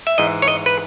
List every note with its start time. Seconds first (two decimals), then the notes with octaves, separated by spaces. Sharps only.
0.07 E5
0.18 G#2 E3 D#5
0.42 C#5
0.48 D#5
0.66 B4